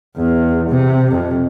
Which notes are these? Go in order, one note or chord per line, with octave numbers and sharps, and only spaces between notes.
E2
C3
F2